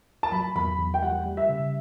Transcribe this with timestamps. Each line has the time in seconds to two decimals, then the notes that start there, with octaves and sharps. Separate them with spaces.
0.23 A5
0.32 F#3 B5
0.56 E2 B5
0.79 E2
0.94 G5
1.02 G3 F#5
1.26 G3
1.37 E5
1.49 C#3